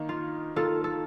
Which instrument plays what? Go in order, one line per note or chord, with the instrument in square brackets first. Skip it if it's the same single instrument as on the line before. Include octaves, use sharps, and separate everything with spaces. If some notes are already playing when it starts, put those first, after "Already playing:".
Already playing: [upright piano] D#3 A#3 D#4
[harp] F4
[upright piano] D#3 A#3 D#4 [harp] F4 A4
[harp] A4